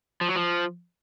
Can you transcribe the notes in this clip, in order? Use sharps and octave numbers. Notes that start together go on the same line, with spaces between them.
F3
F#3
F3